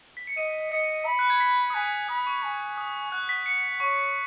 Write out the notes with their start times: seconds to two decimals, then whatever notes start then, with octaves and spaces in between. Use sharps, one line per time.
0.17 B6
0.27 C#7
0.37 D#5 D#7
0.72 D#5 C#7
1.06 B5
1.19 F#6
1.30 G#6
1.40 B6
1.70 D#6
1.74 G#5 F#6
2.09 B5 D#6
2.27 C#6
2.43 G#5
2.78 D#6
3.12 F#5 F#6
3.29 B6
3.46 C#7
3.80 C#5 C#6